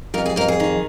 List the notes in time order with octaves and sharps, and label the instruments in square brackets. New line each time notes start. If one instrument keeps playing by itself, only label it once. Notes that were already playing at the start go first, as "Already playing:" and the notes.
[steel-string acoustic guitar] F2 A#4
G#4
F2 A#4
G#4
D#3